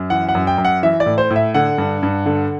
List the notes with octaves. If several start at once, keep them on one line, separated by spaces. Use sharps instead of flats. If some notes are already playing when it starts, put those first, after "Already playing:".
Already playing: F#2
E3 F#5
F#5
F#2
G5
F#2
F#5
E3 E5
D5
A2
C5
A2
E5
D3 F#5
G2
G2
D3